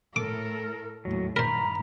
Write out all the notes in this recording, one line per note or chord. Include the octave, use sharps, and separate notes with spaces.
A2 A4 A#4 D6
D#2 A2 F#3
G2 D#3 A#4 C5 A#5 B5